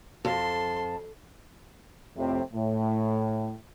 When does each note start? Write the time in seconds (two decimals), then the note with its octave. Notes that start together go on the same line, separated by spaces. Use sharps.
0.25 F2 A4 A5 C6
2.17 F2 A2 C3
2.53 A2